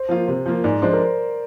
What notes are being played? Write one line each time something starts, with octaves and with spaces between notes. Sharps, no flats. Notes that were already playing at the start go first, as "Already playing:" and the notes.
Already playing: C5
F3 A#3 F4
C3 C5
F3 A#3 F4
G#2 D5
F3 G#3 D4 C5
A#4